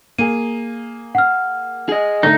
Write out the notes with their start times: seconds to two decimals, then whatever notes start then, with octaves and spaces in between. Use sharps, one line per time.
0.18 A#3 G#4 D#7
1.15 F#5 F6
1.89 G#4 D#5
2.23 D3 A3 D#4